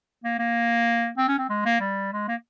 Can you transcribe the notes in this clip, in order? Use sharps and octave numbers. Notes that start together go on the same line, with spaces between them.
A#3
A#3
C4
C#4
C4
G#3
A#3
G3
G#3
A#3